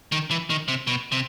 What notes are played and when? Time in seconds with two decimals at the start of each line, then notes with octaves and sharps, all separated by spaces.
0.12 D#3
0.31 E3
0.50 D#3
0.68 C3
0.87 B2
1.12 C3